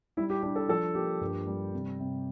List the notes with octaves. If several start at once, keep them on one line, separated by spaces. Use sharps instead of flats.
G3 E4
G4
D4 G4
A4
F3 A4
A#3 G4
G2
G3
C3
C3